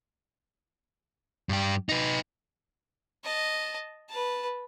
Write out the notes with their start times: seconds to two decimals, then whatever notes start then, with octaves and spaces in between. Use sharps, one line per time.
1.49 G2 G4
1.89 D#4 B4
3.24 D#5 A5
4.10 B4 A5